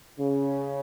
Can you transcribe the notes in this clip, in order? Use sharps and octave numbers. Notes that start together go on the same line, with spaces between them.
C#3